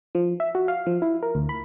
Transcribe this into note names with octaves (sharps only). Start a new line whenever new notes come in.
F3
E5
F#4
F5
F3
E4
A#4
D2
B5